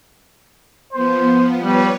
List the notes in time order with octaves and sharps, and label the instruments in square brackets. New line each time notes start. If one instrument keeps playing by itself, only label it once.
[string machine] F3 B3 [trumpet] C5
[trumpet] G3 [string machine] B4 C#5